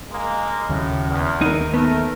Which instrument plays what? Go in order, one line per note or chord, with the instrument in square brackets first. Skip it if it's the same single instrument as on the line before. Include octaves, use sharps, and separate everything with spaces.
[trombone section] G#3 A#3
[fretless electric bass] D#2 C#3 F#3 [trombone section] A2
[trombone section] E2
[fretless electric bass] D#2 [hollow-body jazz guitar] D#4 A#4
[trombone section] A3 A#4 [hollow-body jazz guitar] B3